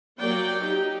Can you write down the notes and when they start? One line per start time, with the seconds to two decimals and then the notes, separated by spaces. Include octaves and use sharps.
0.19 F#3 A#3 D5 G5
0.62 D#4 G4